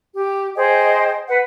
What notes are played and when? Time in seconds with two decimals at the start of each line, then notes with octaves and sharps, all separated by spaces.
0.13 G4
0.56 G#4 C5 D#5 G5
1.29 B4 F#5